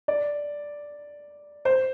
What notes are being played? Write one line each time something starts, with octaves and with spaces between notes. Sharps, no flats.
D5
C5